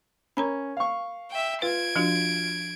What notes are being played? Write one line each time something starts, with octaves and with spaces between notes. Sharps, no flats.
C#4 A#4 A#5 B5
F5 C#6
E5 G5
F4 B4 G#6 D7
F3 D4 F4 F#4